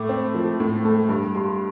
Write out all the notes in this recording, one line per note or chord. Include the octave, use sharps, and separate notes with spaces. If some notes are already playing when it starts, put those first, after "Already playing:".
Already playing: A2 A3 D6
C4
F3
A2
A3
G2
G3 C6